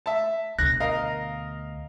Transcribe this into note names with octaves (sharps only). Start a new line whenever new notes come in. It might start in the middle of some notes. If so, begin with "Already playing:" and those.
E5 A5
D2 B2 F#6 A#6
A#4 D#5 F5